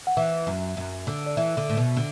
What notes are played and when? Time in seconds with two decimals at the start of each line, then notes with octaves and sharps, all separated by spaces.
0.07 F#5
0.17 E3 E5
0.47 F#2
0.77 F#2
1.07 D3
1.26 D5
1.37 E3 E5
1.57 D3
1.69 A2
1.77 B2
1.97 D3